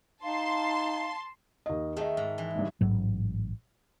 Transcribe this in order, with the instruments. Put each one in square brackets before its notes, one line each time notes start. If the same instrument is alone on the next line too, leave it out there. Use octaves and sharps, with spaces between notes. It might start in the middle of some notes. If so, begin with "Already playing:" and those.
[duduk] D#4 [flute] F5 [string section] A5 C6
[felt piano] D#2 D#5
[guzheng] D#3 A3 [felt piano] G#4 D#5
[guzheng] G#2
E3
[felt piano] G#1 G2
[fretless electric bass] A1 G#2 F#3